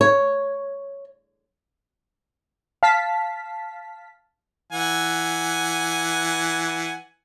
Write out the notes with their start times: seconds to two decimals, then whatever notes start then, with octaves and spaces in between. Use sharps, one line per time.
0.01 C#5
2.83 F5 A5 B6
4.71 E3 F#5 G#5